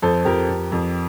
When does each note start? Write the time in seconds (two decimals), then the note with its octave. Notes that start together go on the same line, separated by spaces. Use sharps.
0.02 F2 A4 C5
0.25 F2 G4 A#4
0.48 F2
0.72 F2